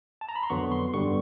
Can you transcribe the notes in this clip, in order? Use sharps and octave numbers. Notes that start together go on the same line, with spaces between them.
A5
A#5
B5
C6
F2 D3 F#3 B3 C#6
C6
G2 D3 G3 B3 C#6